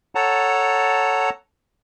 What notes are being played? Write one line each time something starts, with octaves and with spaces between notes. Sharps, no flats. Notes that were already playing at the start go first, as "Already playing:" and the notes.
A4 C#5 F#5 A5 A#5